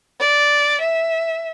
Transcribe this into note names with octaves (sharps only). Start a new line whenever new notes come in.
D5
E5